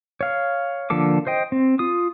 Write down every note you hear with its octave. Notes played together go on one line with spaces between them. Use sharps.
C#5 F5
D3 F3 A#3 A4 D6
C5 D#5 G5
C4
F4 D#6